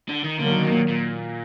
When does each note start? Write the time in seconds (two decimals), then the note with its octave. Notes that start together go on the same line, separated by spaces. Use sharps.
0.09 D3
0.24 D#3
0.40 D3 D#3 F#3 A#3
0.64 B2
0.72 A#2
0.89 A#2